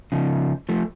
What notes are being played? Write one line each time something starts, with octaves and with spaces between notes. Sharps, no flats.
C#3 F3
F3 A3